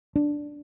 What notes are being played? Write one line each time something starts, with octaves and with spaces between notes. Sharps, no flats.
D4